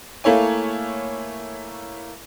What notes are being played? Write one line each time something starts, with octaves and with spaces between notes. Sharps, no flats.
A3 A#3 E4 C#5 G#5